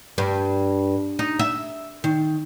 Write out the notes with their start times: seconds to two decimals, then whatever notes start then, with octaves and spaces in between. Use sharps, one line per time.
0.18 G2
1.19 D#4
1.39 E5
2.04 D#3